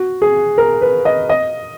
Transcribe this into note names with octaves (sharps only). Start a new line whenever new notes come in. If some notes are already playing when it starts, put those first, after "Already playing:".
Already playing: F#4
G#4
A#4
B4
D#5
D#5